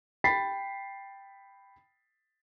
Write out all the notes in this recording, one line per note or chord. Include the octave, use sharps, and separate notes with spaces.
G5 B5 A6 B6 C7